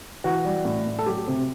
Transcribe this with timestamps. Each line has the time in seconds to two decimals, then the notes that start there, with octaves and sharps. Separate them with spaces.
0.24 E3 F#4
0.45 G3
0.65 A2
0.86 A2
0.99 A4
1.06 F#3 G4
1.28 C3